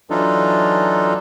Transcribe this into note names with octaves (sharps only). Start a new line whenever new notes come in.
E3 F#3 D4 D#4 F4 A4